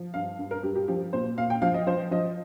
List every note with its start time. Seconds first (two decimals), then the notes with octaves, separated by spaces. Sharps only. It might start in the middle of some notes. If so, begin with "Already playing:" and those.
Already playing: F3
0.14 G2 F5
0.39 G2
0.51 A#4
0.63 G2 G4
0.76 G4
0.88 F3 G4
1.13 A#2 C5
1.37 A#2 F5
1.50 G5
1.62 F3 F5
1.74 D#5
1.87 F3 C5
2.11 F3 D#5